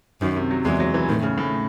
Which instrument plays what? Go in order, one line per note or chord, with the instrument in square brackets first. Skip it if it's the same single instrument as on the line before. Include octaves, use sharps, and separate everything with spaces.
[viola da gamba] F#2 [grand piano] D#3
[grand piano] C3
F#3
[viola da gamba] E2 [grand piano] G#3
[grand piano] F#3
E3
[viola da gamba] A2 [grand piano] D#3
[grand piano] C#3
A2